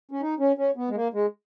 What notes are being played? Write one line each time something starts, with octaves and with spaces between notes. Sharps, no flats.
C#4
D#4
C#4
C#4
B3
G#3
A#3
G#3